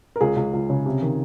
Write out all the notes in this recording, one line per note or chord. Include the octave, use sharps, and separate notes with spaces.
A#4
C#2 G#4
C#2
C#2
C#3
C3
D#3